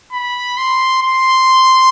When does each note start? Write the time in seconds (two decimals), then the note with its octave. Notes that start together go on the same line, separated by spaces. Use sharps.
0.12 B5
0.57 C6
1.02 C6